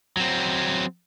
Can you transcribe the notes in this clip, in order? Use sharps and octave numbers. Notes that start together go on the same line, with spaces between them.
F#3 C4